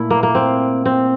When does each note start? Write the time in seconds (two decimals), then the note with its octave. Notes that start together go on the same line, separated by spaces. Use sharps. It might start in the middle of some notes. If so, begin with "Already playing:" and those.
Already playing: A#2 A3 E4
0.10 A#3
0.23 A#3
0.35 C4
0.86 C4